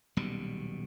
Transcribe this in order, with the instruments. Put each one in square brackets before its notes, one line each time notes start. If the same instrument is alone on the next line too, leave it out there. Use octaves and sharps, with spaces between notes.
[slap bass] D#1 B1 B2 G3